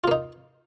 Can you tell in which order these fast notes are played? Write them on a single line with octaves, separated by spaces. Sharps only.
F4 A#3 D#4